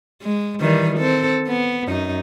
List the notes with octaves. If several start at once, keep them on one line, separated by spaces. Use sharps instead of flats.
G#3
D#3 E3 G3
C4 A4
B3
F#2 D#4